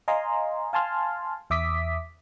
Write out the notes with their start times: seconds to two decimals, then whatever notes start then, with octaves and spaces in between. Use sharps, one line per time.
0.08 D#5 F5 G#5 A#5 C6
0.73 F5 G#5 A5 C6 F6
1.50 E2 E5 D6 D#6 B6